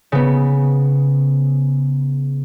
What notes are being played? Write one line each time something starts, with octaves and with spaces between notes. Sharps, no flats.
C#3 B3